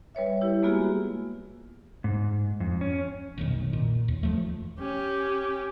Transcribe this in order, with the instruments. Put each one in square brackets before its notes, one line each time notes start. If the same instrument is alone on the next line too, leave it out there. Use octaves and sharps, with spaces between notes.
[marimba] G3 B4 C#5 E5
E4 G4 C#5
G#3 A#3 B3 F4 F#4 G#4
[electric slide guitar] G#2
F2
C#4
[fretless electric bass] F1 B1 D#3
A#2
D#2
F1 F3 A3
[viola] C#4 G4